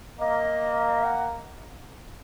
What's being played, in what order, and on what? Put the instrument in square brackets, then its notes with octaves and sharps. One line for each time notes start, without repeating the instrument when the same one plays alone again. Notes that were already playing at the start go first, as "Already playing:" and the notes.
[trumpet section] A#3 [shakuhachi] D#5
[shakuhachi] F#5